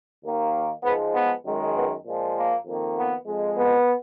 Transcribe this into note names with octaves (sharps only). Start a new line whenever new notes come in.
D#2 D#3 A#3
G#2 F3 G#3 B3
B3
F#2 D#3 G#3
B3
A#2 F3 G#3
A#3
F2 D#3 A#3
B3
F2 F3 G#3
B3